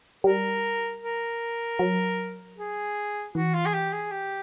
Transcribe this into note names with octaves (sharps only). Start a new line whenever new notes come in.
G3 A#4
A#4
F#3
G#4
E3 F#4
F4
G#4
G4
G#4
G4